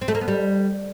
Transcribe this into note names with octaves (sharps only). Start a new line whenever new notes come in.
C4
A3
A#3
B3
G3